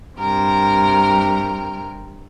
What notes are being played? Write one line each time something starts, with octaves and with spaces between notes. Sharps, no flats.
G2 C3 A#4 G5